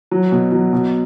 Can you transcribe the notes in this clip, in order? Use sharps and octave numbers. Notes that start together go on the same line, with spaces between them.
F#3
B2
F#3
B2